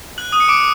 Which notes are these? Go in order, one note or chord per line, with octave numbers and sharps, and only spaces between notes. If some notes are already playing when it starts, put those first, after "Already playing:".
F#6 F#7
D#6 D#7
C#7
D6 D7